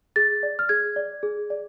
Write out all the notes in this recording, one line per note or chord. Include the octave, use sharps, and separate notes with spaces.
G#4 A6
D5
F6
G#4 G#6
D5
G#4
D5